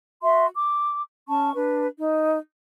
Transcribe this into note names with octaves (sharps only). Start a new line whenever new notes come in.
F#4 E5 C6
D6
C#4 A5 C#6
D4 B4
D#4